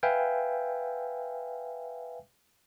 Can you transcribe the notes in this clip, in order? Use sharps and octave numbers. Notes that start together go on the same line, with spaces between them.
B4 E5 F5 G5 G#5